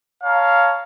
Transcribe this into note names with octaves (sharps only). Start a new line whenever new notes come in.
C#5 F5 A5 A#5